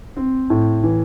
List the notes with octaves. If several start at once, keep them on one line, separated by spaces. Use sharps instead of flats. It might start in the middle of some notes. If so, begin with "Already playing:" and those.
C4
A2
E3